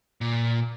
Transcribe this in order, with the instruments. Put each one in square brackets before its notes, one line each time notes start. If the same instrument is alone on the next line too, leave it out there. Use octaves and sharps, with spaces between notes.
[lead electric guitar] A#2